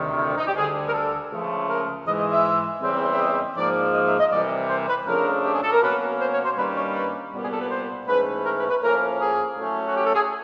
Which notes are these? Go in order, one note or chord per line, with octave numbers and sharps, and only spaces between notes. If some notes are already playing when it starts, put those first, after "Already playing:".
Already playing: D2 C3 D#3 G3
E4
D4
D#4
G4
D2 D3 G3 G#4
A#4
A4
C#2 C#3 F3 A3
A#4
G#2 E3 G#3 D#5
D#5
E5
E2 C#3 E3 G3 C4
E5
D#5
G#2 F3 A#3 D5
D#5
E5
D#5
C2 C3 E3 G3 D5
C5
B4
F2 C#3 F3 A3 D4 A#4
G4
G#4
A4
A#4
B2 F#3 A#3 C#4 B4
C5
C#5
C5
G2 D#3 G3 A#3 C#4 B4
C#5
B4
C2 A#2 G3 B3
G#4
A4
B4
C5
G#2 E3 A3 C#4 B4
A#4
B4
B4
A2 F3 A#3 C#4 A#4
G#4
A2 F#3 A3 C#4
F#4
G4
A4
G#4